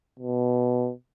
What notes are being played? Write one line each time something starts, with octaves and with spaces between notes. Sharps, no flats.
B2